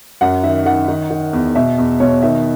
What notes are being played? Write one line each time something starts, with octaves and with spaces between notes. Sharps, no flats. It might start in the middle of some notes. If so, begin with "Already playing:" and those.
F#2 F#5
D#3 E5
D#3 F#5
D#3
D#3
E2
B2 E5
E2
B2 C#5
D#3 E5